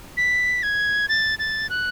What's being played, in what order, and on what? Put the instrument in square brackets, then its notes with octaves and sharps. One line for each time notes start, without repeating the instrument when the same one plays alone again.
[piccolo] B6
G#6
A6
A6
F#6